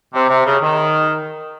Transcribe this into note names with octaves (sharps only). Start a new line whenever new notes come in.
C3
C3
C#3
D#3